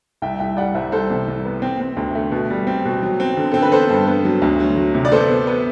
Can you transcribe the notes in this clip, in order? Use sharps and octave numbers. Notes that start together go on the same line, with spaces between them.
C2 E5 G5
C2 E5 G5
G3 D5 F#5
C2 C5 E5
C2 A4 C5
C3
C2
B3
C4
C4
D2
A3
B2
G3
C4
B2
F#3
C4
D3
C4 A4
B4
B3 A4 C5
G2
B3
F#3
D2
F#3
F#3
C3
D5
B3 A4 C5
B3
B3